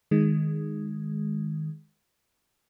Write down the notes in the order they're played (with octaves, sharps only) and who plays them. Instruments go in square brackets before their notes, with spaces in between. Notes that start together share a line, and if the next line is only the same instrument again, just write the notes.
[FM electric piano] D#3 G#3